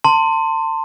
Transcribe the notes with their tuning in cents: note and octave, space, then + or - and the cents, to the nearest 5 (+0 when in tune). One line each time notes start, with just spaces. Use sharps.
A5 +35 C6 +0